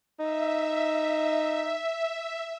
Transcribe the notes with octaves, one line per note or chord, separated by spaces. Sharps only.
D#4 E5